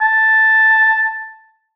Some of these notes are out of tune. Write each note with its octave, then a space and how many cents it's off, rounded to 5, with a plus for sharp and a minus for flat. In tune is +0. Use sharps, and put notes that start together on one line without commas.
A5 +0